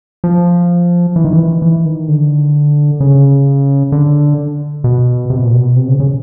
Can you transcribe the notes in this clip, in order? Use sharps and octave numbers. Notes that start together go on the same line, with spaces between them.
F3
E3
D#3
E3
E3
D#3
D3
C#3
D3
B2
C3
B2
A#2
B2
C3
C#3
C#3